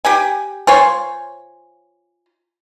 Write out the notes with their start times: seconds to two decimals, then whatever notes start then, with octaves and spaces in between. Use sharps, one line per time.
0.05 G4 G5 G#5
0.67 F4 C5 C#5 G#5